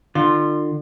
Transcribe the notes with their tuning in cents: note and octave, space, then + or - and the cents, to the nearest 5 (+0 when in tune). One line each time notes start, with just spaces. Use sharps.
D3 +40 F4 +0